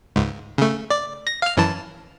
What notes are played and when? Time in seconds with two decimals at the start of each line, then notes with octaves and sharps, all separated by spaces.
0.16 C#2 G#2
0.58 C#3 A3
0.90 D5
1.27 A#6
1.42 F5 F6
1.57 F#2 E3 A5